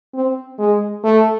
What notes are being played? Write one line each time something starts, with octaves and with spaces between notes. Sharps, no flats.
C4
G#3
A3